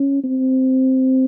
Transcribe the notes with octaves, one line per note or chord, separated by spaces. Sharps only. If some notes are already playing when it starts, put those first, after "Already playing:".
Already playing: C#4
C4